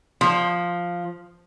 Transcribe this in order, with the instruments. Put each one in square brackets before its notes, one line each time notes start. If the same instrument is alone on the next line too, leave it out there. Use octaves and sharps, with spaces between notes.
[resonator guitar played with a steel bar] F3